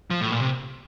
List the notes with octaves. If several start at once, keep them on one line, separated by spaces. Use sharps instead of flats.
F3
A2
A#2
C3